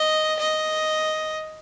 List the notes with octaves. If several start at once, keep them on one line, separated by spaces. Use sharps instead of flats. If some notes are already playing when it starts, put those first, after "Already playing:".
Already playing: D#5
D#5